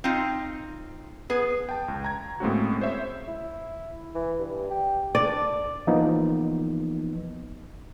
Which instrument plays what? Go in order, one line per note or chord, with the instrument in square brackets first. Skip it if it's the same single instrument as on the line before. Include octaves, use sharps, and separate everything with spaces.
[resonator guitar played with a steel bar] C4 D#4 F4
[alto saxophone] B3 [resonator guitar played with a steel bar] G#4
[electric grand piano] G5 A5
C#2
A#5 G#6
A2 G#3 A#3 C4 C#4 F#4
C5 C#5 E5
[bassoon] E4
E3
G2
G4
[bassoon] D4 [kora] D5
[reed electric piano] E3 F3 A#3 B3 D#4